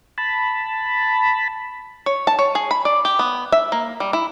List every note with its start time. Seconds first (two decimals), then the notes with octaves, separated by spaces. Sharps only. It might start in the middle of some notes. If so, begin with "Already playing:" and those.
0.18 A5 B5
2.06 C#5
2.27 A5
2.39 C#5
2.55 G#4
2.71 B5
2.85 D5
3.05 G4
3.19 B3
3.52 E5
3.72 A#3
4.00 G3
4.13 E4